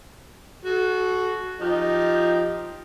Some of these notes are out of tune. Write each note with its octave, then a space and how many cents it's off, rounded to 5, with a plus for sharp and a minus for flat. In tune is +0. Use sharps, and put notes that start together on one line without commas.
F#4 +0 A4 -35
F3 +0 D#4 +0 G4 +0